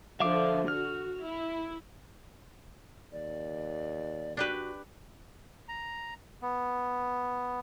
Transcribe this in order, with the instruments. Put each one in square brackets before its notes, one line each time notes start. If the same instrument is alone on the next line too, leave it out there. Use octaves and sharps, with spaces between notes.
[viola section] D3 F3 [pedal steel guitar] E5 F5 D6
[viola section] F#4 [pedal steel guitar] F6
[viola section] E4
[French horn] D#2 [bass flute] D5
[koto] D4 G4 B4 [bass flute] F#4
[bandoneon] A#5
B3